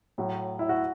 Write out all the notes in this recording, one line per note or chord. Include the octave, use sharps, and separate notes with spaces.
A2 F#3
E4
F#4